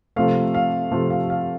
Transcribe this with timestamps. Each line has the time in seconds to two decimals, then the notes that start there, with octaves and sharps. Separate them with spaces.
0.16 C3 F3 A3 F5
0.54 F5
0.91 C3 F3 A3
1.10 F5
1.30 F5